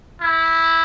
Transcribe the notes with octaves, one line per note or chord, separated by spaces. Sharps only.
E4